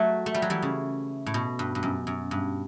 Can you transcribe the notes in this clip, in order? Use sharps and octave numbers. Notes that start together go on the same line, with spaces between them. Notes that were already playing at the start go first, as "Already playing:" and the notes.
Already playing: F#3 A3
A3
G3
F#3
E3 G3
C#3
A2
B2
G2
G2
F#2
F#2
G2